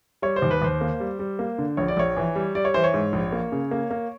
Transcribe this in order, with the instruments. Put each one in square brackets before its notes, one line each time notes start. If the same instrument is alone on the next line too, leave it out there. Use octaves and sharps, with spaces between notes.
[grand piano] G3 C#5
C5
D#2
B4
D#2 C5
A#3
G3
G3
A#3
D3
A#1 C#5
D5
A#1 C#5
E3
G3
G3 D5
C#5
E3 C5
C#5
G#2
A#1
A#3
C#3
A#3
A#3